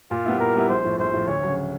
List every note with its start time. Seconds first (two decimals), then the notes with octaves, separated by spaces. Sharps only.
0.11 A#2 F4
0.25 G3 B3 E4
0.40 A#2 A#4
0.54 G3 B3 E4
0.69 A#1 C5
0.84 A2 F3
0.99 A#1 C5
1.14 A2 F3
1.28 D2 C#5
1.43 C#3 F#3